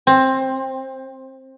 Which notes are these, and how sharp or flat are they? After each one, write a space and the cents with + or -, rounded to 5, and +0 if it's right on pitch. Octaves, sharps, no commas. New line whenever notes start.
C4 +15